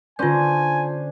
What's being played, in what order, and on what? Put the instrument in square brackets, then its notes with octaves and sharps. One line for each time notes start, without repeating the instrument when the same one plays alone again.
[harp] D3 C#4 [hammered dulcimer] D4 C5 [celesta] F4 G6 [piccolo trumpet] G#5